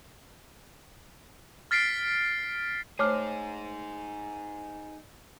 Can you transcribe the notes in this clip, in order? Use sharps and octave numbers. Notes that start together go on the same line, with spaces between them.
F6 A6 B6 C7 D7
A3 D#4 G#4 C5 C#5 D6 F6